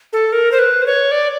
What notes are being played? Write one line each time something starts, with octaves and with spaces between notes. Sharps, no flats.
A4
A#4
C5
B4
C5
C#5
D5